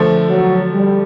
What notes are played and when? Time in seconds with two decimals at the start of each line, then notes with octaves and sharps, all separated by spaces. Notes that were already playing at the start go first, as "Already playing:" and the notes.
Already playing: D3 F3 A3
0.29 F#3
0.72 G3